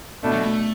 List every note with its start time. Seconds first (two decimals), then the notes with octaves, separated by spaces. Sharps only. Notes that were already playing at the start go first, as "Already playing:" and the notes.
0.22 B2 A3 D4
0.32 F#3
0.43 A3